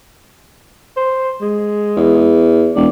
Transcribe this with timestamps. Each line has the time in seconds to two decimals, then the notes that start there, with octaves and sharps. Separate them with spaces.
0.97 C5
1.41 G#3
1.97 E2
2.76 E1 D5